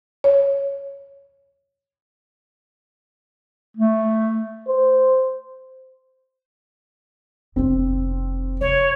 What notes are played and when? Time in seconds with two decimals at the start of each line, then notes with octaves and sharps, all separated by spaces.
0.24 C#5
3.77 A3
4.67 C5
7.56 F1 D#2 C4
8.61 C3 C#5